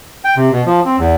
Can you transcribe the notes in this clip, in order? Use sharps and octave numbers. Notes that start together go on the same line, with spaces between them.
G5
C3
B2
F3
C4
E2